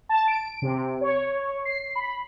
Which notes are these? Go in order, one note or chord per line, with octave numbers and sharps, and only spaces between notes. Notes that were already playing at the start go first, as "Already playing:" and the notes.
A5
D7
C3
C#5
C7
B5